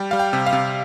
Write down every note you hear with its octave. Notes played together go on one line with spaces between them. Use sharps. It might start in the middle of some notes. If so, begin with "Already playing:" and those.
Already playing: G3 G5
G3 F5
G5
C3
F5
C3